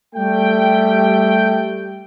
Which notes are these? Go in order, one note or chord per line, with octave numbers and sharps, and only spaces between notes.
G3 A3 G5